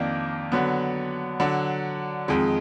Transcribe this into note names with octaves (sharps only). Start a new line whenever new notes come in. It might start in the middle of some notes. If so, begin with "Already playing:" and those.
Already playing: F2 D#3 A#3 D4
D3 F#3 B3
D3 F#3 D4
F2 D#3 G#3